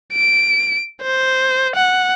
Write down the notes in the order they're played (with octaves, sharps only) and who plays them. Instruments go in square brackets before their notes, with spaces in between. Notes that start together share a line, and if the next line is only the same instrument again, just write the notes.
[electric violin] D7
C5
F#5